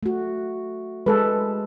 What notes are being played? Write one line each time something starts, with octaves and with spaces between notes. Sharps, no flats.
A3 F#4
G#3 A4 B4